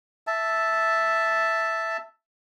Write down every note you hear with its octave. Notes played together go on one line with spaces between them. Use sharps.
E5 A5